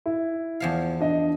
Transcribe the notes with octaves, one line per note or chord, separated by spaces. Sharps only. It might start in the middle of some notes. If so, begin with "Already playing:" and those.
E4
E2 F3 F5
D4 D#5